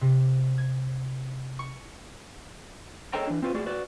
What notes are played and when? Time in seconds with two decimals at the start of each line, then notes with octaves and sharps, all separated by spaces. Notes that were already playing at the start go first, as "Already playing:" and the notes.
0.01 C3
0.58 G#6
1.59 C#6
3.13 G#4 A4 C#5 D#5 G5 A#5
3.27 E3 D4
3.42 C4 F4 B4
3.54 A3 F#4 G#4 D5
3.66 F#4 B4 D5